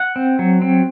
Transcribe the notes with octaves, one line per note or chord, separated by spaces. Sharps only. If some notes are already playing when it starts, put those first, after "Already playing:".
Already playing: F#5
C4
F#3
C4